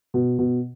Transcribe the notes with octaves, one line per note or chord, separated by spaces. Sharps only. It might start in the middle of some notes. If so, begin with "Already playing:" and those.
B2
B2